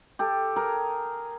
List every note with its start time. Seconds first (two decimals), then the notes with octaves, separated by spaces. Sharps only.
0.19 G4 A4
0.56 G#4 A#4